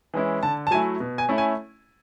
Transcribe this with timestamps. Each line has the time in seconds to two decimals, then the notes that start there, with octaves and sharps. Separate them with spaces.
0.14 E3 G#3 C#4 E4
0.43 D3 A5
0.67 A5
0.71 F#3 A3 E4 G#5
1.00 B2
1.18 G#5
1.29 A3 C#4 E4
1.38 G#5